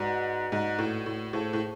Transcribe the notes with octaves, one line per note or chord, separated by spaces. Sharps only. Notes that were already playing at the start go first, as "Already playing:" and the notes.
Already playing: G#2 F#4 B4 D5 F#5
G#2
A2
A2
A2 G#4 C5 F5 A5 C#6
A2